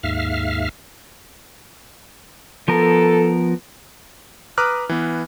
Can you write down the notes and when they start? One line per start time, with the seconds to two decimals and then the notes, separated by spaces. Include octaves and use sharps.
0.03 D#2 G#2 E5 F5 F6
2.68 F3 B3 A4 A#4
4.58 B4 A#5 D6 D#6 F6 F#6
4.89 E3 B3